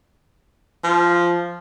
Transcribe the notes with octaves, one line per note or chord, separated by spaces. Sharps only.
F3